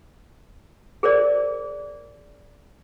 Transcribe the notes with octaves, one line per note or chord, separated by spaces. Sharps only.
G#4 A#4 C5 D5